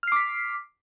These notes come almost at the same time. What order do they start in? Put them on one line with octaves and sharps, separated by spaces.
F6 C7 D6 B6